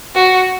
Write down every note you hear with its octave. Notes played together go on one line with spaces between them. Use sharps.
F#4